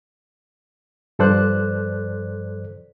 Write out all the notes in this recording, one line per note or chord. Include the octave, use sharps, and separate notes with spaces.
G2 F3 A4 C5 D5 F#6